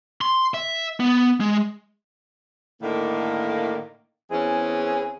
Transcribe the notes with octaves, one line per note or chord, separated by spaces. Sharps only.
C6
E5
B3
G#3
A2 D3 D#3 A#3
E2 E3 C4 C#4 G#4